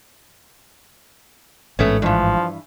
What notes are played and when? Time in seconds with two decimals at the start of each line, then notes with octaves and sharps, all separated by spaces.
1.79 A1 G#2 A3 B3 C#4
2.02 G2 E3 F3